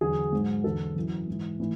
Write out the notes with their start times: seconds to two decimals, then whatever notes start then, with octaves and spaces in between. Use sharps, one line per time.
0.01 E2 D3 F#3 G#4
0.33 G#2 F#3
0.64 E2 D3 F#3 A4
0.96 F#2 E3
1.28 G#2 E3
1.60 A2 E3